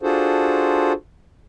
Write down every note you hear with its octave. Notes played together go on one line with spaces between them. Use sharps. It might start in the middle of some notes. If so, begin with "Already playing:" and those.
D4 F4 F#4 G#4 A4 C5